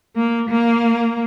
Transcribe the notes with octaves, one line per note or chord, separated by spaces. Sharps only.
A#3
A#3